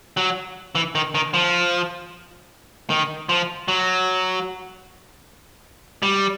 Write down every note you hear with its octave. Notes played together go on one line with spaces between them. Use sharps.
F#3
E3
D#3
D#3
F3
D#3
F3
F#3
G3